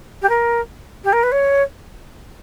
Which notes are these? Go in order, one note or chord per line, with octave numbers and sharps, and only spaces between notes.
G4
A#4
G4
A#4
B4
C#5